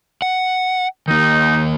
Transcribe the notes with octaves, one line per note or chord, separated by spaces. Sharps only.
F#5
D#3 A#3 D#4